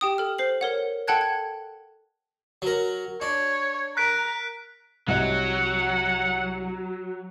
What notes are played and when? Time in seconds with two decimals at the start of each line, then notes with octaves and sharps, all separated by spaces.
0.01 G4 G5 D#6
0.18 A4 F6
0.38 C5 C7 F#7
0.61 A#4 C#5 F#5
1.07 A4 F#5 G5 A5 F#6 G#6
1.21 G#6
2.62 F#3 A#4
3.21 D4 C#5
3.97 A#4 F#6 B6 D7
5.08 C2 F#3 D#5 F#5